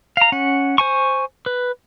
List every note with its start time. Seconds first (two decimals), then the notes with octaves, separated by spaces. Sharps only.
0.17 F5 A#5
0.32 C#4 F#5
0.78 C5 G#5 C#6
1.46 B4